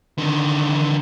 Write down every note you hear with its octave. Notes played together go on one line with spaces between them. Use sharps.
D3 D#3